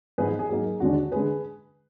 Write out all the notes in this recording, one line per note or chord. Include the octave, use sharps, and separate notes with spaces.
G#2 F3 B3 D#4 G#4 B4
G#4
G#2 F#3 A#3 D#4 G#4
D#2 D3 G#3 D4 F#4
D3 G#3 G#4 B4